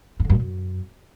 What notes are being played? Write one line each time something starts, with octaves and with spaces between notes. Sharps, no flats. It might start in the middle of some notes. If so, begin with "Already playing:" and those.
G2
D3
F#2
A#2
F#2